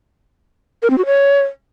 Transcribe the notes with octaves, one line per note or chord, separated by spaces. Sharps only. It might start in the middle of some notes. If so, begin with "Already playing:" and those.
A#4
C4
F#4
C#5